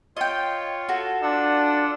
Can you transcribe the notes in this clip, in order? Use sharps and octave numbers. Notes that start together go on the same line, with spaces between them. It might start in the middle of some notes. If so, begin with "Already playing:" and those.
F4 C#5 D#5 G5
F#4 A4
D4 F4 F#5 E6